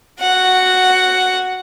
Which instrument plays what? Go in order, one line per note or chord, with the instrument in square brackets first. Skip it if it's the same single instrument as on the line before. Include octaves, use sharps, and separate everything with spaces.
[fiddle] F#4 F#5